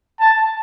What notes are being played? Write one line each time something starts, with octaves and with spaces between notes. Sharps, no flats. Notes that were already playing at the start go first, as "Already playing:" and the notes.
A5